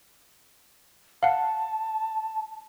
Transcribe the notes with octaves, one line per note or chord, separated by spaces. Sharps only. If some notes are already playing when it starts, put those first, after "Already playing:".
F5 F#5 A5